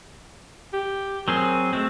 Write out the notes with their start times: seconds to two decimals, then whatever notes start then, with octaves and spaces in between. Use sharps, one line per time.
0.73 G4
1.28 F#3 C4 G#4 A#4
1.73 G#3 A3 C4